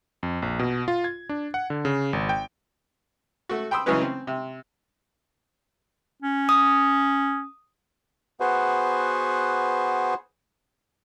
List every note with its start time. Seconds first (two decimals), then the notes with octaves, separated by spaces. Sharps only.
0.23 F2
0.42 A#1
0.59 B2
0.88 F4
1.04 G#6
1.29 D4
1.54 F#5
1.70 D3
1.85 C#3
2.13 G#1
2.29 G5
3.49 A3 F#4
3.71 G5 B5 C6 D#6 E6
3.86 C#3 E3 F#3 G#3 C#4 B4
4.01 C4
4.27 C3
6.22 C#4
6.49 D#6
8.40 B3 F#4 G#4 B4 C5